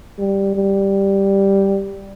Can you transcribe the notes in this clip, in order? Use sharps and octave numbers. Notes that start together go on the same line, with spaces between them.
G3
G3